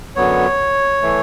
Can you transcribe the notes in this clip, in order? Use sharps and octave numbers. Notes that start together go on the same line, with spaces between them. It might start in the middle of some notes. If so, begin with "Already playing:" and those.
F#2 D3 F#3 B3 C#5
E3 A3